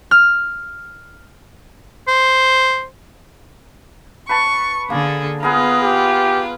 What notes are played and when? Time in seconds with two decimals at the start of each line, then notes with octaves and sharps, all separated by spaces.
0.11 F6
2.08 C5
4.29 B4 A5 C#6
4.90 D3 A#3 G#4 A4
5.43 B3 F4 G#4 A#4 B4
5.83 G4